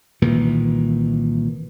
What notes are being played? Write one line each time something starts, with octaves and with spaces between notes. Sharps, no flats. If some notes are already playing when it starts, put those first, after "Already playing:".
C2 A#2 D#3 E3